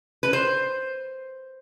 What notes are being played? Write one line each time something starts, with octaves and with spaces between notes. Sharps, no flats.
B4
C5